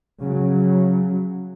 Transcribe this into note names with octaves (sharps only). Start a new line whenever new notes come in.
C#3 F#3